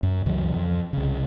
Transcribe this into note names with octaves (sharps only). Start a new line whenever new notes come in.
F#2
C#2 B2 E3 F#3
F2
C2 C#3